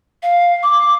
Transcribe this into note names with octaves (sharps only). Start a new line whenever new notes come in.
F5
D6